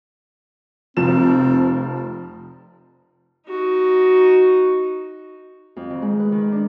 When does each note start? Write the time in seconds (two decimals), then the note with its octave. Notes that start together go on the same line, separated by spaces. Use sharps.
0.97 F1 F3 C4 E7
3.48 D#4 F#4
5.76 F2
5.90 D#3
6.02 G#3
6.19 B4
6.32 D#3
6.52 D4